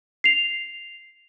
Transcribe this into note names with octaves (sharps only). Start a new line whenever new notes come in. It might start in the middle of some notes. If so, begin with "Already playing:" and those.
C7 F7